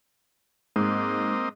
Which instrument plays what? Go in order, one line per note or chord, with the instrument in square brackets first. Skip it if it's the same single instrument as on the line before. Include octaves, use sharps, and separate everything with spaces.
[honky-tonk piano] G#2 [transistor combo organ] A#3 C4 D#5